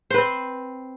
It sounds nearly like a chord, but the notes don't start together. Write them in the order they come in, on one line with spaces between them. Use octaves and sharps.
C5 B4 C4